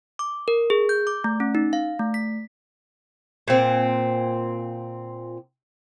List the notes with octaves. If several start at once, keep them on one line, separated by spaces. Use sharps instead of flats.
D6
A#4
G#4
G6
D6
A3
C#4
D#4
F5
A3
B6
A#2 C4